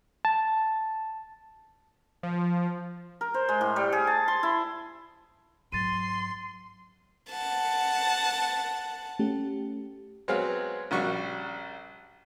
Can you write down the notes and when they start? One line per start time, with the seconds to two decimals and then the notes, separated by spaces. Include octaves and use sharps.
0.25 A5
2.23 F3
3.21 A#4
3.34 C5
3.49 G#3
3.61 A2
3.76 G3
3.92 G#4
4.07 A5
4.28 C6
4.43 E4
5.72 G#2 F#3 C6 A6 D#7
7.31 F#5 A5
9.19 A3 C#4 G4
10.28 F#3 G#3 B3 C4 G#4 F5
10.91 A#1 C#3 G3 F#4 C#6